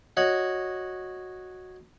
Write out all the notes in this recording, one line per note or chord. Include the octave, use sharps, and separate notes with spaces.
F#4 C#5 D#5 F#5